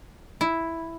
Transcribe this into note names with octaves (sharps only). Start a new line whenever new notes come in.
E4